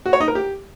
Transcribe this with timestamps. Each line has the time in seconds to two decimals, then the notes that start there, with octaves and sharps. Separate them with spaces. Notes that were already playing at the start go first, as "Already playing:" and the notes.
0.06 F#4
0.13 C#5
0.20 D#4
0.28 A#4
0.35 G4